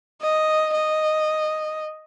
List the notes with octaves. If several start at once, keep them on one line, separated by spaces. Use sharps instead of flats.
D#5
D#5